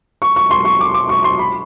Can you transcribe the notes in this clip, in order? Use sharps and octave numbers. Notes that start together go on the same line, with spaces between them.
C#6
C#6
C6
C#6
D6
D6
C#6
C6
B5